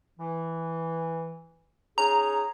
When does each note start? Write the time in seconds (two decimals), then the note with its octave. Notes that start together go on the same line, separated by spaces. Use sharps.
0.19 E3
1.98 C#4 D#4 G#4 A#5